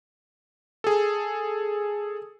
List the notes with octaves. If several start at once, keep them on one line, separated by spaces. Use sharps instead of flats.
G#4 A4